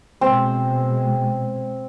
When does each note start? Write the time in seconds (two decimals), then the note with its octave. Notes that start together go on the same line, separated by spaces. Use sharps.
0.21 B2 G#3 C4